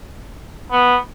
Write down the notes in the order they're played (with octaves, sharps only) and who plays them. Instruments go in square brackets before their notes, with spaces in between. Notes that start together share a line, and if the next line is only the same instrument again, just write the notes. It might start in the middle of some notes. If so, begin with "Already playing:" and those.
[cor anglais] B3